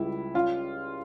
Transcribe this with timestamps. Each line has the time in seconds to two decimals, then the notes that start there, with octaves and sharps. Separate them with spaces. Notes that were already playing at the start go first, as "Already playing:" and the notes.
Already playing: C#2 G3 E4
0.34 C#4 F4